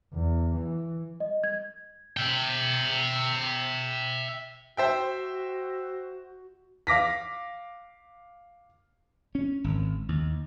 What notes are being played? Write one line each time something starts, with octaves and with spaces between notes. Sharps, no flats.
E2
E3
D#5
G#6
E5 G5
F#4 C5 E5 G5
F5 D6 A#6 B6
C#4
G#1
D#2